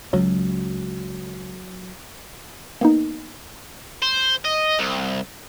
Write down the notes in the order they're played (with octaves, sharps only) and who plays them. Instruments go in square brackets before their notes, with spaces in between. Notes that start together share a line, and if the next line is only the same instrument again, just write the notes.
[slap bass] C#2 [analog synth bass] F#3
[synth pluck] A#3 B3 D#4
[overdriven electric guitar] C5
D#5
C2